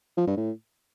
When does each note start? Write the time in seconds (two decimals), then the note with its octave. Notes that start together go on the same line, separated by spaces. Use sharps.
0.17 F3
0.27 G2
0.37 A2